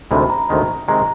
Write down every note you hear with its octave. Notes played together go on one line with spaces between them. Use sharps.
D2 C3 D#3 G#3 B5
A#5
D2 C3 D#3 G#3
C3 D#3 G#3 A#5